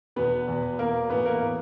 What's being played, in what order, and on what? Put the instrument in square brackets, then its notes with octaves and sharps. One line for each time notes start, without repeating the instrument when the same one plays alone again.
[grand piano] E2 B2 B3 B4
E2 B2
E2 B2 A#3 A#4
A2 E3 B3 B4
A#3 A#4
A2 E3